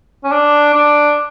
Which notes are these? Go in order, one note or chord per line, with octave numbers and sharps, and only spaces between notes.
C#4
D4
D4